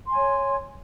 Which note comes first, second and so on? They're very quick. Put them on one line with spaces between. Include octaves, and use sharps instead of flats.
C6 G#5 C#5